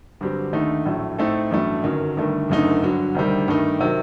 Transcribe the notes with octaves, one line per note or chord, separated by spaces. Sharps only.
G1 G2 F#3 C4 G4
D#2 D3 A3 D#4
A#1 A2 F#3 A3
A2 A3 C4 D#4 A4
A1 G2 F#3 A3
G1 F#2 D#3 F#3
G1 G2 D#3 A3
F#1 F#2 D3 A3 D#4
G2 D3 F#3
D2 C3 D#3 G3
G2 D#3 A3 D#4
C3 D#3 F#3